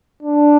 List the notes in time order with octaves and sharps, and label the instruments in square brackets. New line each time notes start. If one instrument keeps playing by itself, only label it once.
[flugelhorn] D4